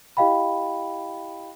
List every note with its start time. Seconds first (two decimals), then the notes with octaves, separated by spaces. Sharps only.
0.17 E4 G4 D#5 F5 G5 B5